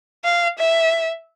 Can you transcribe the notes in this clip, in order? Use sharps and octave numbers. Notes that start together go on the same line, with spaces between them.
F5
E5